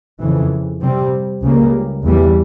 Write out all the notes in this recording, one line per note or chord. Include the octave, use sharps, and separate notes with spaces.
F2 C#3 E3
C3 G3 C4
C#2 C#3 G3 A#3
E2 E3 G3